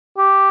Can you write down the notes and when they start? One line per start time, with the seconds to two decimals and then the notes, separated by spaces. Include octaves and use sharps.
0.18 G4